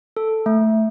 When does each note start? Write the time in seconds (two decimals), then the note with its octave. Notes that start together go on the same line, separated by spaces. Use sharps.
0.17 A4
0.46 A3